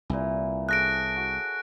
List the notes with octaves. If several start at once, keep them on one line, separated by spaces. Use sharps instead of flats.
C2 A#2 E3
G#4 A4 C#5 F#6 A#6 D7
F#4